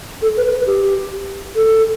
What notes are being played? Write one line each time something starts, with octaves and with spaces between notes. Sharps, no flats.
A4
B4
B4
G4
A4